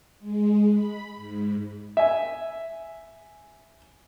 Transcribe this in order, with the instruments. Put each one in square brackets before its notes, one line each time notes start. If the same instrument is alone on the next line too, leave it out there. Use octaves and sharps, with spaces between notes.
[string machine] G#3
B5
G#2
[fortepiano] E5 G#5